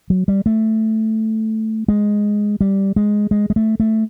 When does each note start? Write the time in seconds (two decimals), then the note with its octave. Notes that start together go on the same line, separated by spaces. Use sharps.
0.10 F#3
0.28 G3
0.46 A3
1.88 G#3
2.61 G3
2.96 G#3
3.31 G#3
3.50 G#3
3.56 A3
3.80 A3